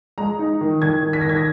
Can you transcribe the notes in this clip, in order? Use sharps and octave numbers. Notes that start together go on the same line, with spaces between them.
G#3 A#5
D#4
D#3
D#3 G#6
D#3
B6
A#6
D#3
G#6
A#6